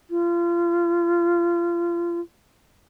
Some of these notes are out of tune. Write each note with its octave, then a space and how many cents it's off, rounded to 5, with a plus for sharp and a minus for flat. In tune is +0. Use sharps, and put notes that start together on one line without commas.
F4 -30